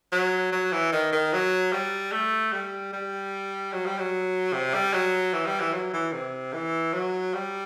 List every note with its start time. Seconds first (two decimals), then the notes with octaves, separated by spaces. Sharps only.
0.12 F#3
0.52 F#3
0.72 E3
0.92 D#3
1.13 D#3
1.33 F#3
1.73 G3
2.12 A3
2.53 G3
2.93 G3
3.73 F#3
3.86 G3
3.99 F#3
4.53 C3
4.74 G3
4.93 F#3
5.33 E3
5.46 G3
5.60 E3
5.73 F#3
5.93 E3
6.13 C3
6.54 E3
6.93 F#3
7.34 G3